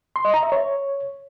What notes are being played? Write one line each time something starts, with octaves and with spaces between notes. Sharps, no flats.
C6
D#5
A#5
E5
C#5